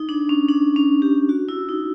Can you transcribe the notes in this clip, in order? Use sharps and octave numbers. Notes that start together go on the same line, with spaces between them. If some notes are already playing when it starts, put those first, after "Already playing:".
Already playing: D#4
D4
C#4
D4
C#4
G4
F#4
E4
D#4